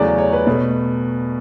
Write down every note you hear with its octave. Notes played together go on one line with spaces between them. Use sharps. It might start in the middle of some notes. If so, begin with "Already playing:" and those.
Already playing: E2 C#3 F#3 A3 D5
C#5
B4
B2 A3